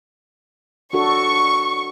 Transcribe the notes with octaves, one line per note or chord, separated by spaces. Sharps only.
D4 F#4 A4 C#6